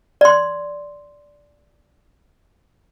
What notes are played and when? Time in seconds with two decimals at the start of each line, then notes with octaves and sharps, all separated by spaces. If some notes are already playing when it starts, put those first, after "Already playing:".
0.21 D5 C6